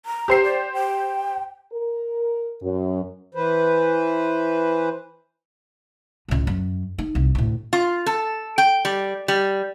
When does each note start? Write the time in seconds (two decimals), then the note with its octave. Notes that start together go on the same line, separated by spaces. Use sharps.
0.06 A#5
0.28 G4 C5 C7
0.44 D5
0.73 G5
1.73 A#4
2.62 F#2
3.35 E3 B4 C5
6.28 C#2 A2
6.47 F#2
6.98 D#4
7.15 C2
7.35 D2 A2
7.73 F4
8.06 A4
8.58 G5
8.85 G3
9.28 G3